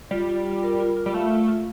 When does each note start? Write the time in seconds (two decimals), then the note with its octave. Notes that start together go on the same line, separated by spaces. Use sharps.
0.11 G3 F4
0.29 F4
0.46 F4
0.63 A#4
0.80 F4
0.97 F4
1.06 G3
1.14 A3 F5
1.30 F4
1.48 F4